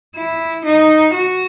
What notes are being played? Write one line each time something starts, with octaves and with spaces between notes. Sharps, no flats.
E4
D#4
F#4